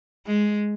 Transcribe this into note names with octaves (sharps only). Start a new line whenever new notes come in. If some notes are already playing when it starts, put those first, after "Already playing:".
G#3